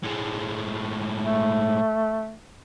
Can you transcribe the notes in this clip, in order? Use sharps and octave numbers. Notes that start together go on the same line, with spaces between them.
A2 G#3
A3